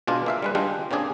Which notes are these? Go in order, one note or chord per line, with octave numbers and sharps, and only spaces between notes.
B2 G#3 D4 F4
A#3 E5 F5
G3 G#3 B4
G3 G#3 D4 F4 G4
C3 A#3 C#4 D4 G#4